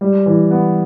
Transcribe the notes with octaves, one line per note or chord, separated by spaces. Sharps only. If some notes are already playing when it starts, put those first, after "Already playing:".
G3
E3
B3